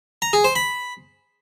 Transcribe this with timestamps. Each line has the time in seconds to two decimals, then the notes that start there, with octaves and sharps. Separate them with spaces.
0.22 A#5
0.33 G#4
0.44 C5
0.56 B5